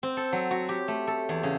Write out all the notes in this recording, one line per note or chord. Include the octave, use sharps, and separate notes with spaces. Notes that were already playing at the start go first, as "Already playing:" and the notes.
C4
A4
F#3
F#4
G4
A3
A4
E2
C#3